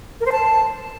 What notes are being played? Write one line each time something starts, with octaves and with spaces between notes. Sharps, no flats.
A#4
C5
A5